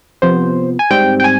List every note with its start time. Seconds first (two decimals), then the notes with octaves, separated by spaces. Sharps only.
0.22 C3 F3 B3 C5
0.79 G#5
0.90 G#2 G3 C4 G5
1.20 G5
1.24 G#5